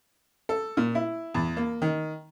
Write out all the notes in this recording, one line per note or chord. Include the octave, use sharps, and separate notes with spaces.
A4
A#2
E4
E2
A#3
D#3